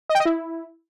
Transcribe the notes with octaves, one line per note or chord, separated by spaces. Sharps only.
D#5
G5
D#5
E4